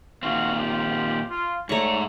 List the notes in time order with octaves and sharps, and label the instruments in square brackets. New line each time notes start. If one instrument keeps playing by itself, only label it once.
[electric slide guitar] A#2 D#3 C4 [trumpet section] F#4 F5
[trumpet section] F4 G4
F4
[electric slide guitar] G#2 A#5 [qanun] A3 C#6 [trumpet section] C#5 D5